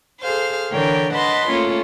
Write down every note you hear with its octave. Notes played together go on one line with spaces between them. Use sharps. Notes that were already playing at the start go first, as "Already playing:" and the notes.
G#4 A4 C5 F5
D3 E3 A#4 C#5 G5
B4 D#5 F#5 A5 B5 C6
A3 A#3 C#4 F4